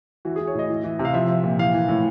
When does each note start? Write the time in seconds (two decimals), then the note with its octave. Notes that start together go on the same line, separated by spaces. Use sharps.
0.25 E3 F#4
0.36 G#4
0.40 E3
0.47 C#5
0.54 A2 D#5
0.70 E3
0.84 E3
0.99 C3
1.05 F5
1.14 F3 E5
1.29 F3
1.44 A#2
1.59 E3 F5
1.74 E3
1.89 A2